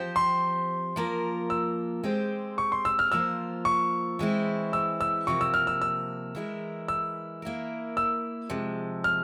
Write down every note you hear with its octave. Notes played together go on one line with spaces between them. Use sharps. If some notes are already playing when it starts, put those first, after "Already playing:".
Already playing: F3 C4 G4 C5
C6
F3 A#3 F4 A#4
E6
G#3 C4 G4 C5
C#6
C6
E6
F6
F3 A#3 F4 C5 E6
C#6
E3 G#3 C4 E4
E6
E6
C3 F3 A#3 C#6
E6
F6
E6
E6
E3 G#3 E4 G4 A#4
E6
A#3 E4 A#4
E6
C3 F3 G#3
F6